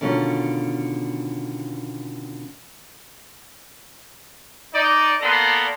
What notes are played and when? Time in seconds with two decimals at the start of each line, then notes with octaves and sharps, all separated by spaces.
0.01 B2 D3 D#3 C#4 F4
4.74 D#4 D5
5.21 A#3 B3 A4 D5 A#5 C6